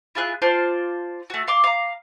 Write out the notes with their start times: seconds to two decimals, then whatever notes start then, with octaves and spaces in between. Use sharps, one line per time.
0.15 E4 F4 G#4 F#6
0.42 F4 C5 D5 A5
1.30 A3 F#4
1.48 F5 C6 D6
1.64 F5 A#5